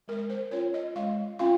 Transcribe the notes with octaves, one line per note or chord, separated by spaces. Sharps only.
G#3 A#4
C5
C#4 F4 C#5
D#5
G#3 F5
C#4 F4 F5